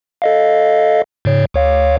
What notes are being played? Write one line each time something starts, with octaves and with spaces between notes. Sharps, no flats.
A4 D#5 F5
G#2 C#3 C#5
D2 C#5 F5